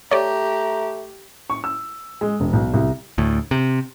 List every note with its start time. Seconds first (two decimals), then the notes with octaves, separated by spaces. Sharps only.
0.11 A3 G4 C#5 D5 A#5
1.50 C#6
1.64 E6
2.21 G#3
2.40 E1
2.53 B1
2.74 C2
3.18 D2 A2
3.51 C3